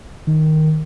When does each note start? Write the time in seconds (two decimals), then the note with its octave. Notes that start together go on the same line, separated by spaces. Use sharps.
0.27 D#3